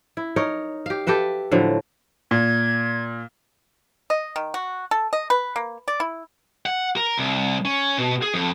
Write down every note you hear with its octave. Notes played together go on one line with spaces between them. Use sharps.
E4
D#4 A#4 C#5
G4 F5
G4 A4 B4 E5
A2 D3 F3 F#3
A#2 G#6
D#5
D#3
F#4
A4
D#5
B4
A#3
D5
E4
F#5
A#4
C2
C#4
B2
G#4
F2